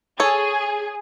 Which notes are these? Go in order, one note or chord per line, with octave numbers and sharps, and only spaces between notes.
G#4 A4 C#5